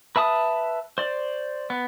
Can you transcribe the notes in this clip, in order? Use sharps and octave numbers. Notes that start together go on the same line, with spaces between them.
B4 E5 A5 D#6
C5 D5
B3